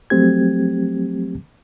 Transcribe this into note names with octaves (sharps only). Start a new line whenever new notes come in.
F3 F#3 A3 C4 G4 G#6